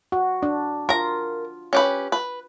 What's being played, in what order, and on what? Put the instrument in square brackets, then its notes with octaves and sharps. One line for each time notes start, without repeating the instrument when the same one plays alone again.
[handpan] F#4
D4
[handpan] F4 [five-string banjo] A#4 A#5
[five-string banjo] C#4 G4 B4
B4